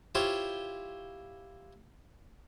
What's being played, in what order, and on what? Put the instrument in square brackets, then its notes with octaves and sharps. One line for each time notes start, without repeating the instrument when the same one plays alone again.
[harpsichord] E4 F4 G4 C5 C#5 F5